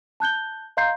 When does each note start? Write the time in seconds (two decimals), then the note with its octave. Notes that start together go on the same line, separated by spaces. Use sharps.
0.20 A5 F#6 G6 G7
0.77 D#5 F5 A#5 C6 G6 C7